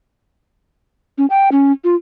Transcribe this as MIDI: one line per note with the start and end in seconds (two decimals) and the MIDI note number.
1.18 1.26 61
1.30 1.49 79
1.52 1.72 61
1.84 1.95 65